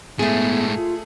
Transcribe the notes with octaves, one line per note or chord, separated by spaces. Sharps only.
A2 G#3 A3 B3 G#4
F4